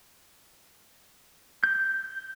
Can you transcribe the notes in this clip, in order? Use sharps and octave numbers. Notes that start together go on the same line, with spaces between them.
G6